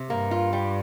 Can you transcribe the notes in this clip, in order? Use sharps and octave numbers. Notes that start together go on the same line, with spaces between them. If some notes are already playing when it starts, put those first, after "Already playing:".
Already playing: C3
G2 A#3
F4
G3